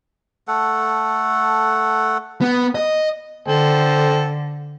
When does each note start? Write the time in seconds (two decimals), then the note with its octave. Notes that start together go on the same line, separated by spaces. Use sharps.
0.48 A3 A4 F#5
2.42 B3
2.75 D#5
3.48 D3 A4 C5 G5